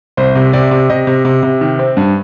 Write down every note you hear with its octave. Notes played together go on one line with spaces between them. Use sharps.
C2 C5
C3
C3 D5
C3
C3 D#5
C3
C3
C3
D#3
C4
G2